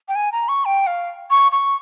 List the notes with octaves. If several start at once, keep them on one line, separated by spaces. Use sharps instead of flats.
G5
G#5
A#5
C#6
G5
F5
C#6
C#6